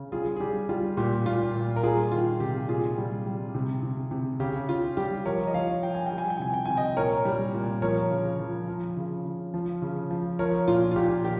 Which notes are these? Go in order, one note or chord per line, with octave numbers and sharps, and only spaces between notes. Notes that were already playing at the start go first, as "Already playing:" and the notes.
Already playing: C#3
G3 F4 G#4
G#4
G3 G4
G3 F4
A#2 G4
A#2 F4
A#2
A#4
G3 F4 G#4
D#3 F4
C3 G4
A#2 F4 G#4
G3
G3
C3
C3
C3
C#3 G4
C#3 F4
G3 G4
F3 A#4 C#5
D#5
F3 C#5 F5
F3 G5
G#5
G3 G5
G#5
G5
C3 G#5
G5
C3 G#5
D#5 G5
A#2 A#4 C#5
G3
A#2
F3 A#4 C#5
C#3
F3
F3
C#3
C#3
F3
C#3
F3
F3 A#4 C#5
A#2 F4
F4
A#2 G4
D#3 G4